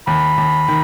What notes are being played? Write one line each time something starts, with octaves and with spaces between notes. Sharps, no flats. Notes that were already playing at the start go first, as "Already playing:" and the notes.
D#2 B5
D#2
D#3